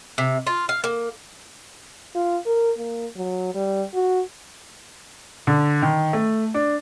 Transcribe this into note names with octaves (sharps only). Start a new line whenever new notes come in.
C3
F4
F5
A#3
F4
A#4
A#3
F#3
G3
F#4
D3
D#3
A3
D4